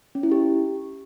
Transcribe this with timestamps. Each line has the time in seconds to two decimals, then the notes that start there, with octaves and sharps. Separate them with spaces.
0.15 C#4
0.23 E4
0.32 G4